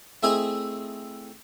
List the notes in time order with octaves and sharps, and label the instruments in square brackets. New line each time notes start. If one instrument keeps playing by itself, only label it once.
[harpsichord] A3 C4 E4 G#4 D#5 G#5